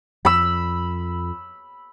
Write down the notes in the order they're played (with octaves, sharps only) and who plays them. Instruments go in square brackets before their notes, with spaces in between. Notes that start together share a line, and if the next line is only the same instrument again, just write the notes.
[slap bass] F2 [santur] B5 E6